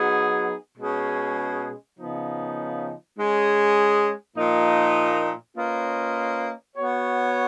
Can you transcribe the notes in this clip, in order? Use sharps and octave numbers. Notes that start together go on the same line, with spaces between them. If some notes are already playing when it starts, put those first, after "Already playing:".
Already playing: F#3 B3 D#4 G#4
B2 G#3 C#4 G#4
C#3 F3 B3 D#4
G#3 C#4 G#4
A#2 F3 A#3 D#4
A#3 C#4 F4 B4 D#5
B3 F#4 C#5